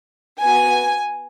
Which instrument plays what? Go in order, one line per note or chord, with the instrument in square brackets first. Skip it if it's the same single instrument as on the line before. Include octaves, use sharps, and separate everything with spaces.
[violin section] B3 F#4 G#5